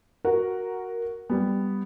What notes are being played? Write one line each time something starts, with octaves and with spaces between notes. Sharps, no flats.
F#4 A#4 F#5
G3 B3